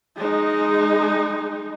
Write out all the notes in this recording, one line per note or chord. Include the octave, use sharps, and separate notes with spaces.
G#3 D#4